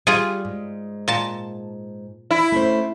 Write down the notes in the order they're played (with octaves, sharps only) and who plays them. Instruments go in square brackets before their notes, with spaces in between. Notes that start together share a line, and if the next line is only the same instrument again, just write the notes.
[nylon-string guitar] G3 [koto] F4 G#4
[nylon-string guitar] G#2
[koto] A#2 A5
[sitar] E4
[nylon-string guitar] A3 C#4 C5